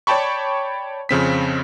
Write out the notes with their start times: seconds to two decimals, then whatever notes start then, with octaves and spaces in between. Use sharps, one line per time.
0.07 C#5 D5 G5 A5 B5 C#6
1.09 F2 C#3 C4 B6